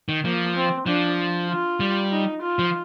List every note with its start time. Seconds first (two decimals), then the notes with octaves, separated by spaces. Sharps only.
0.09 D#3
0.24 F3 A#3
0.56 C4
0.86 F3 D4
1.49 F4
1.80 G3
2.12 D#4
2.42 F4
2.59 F3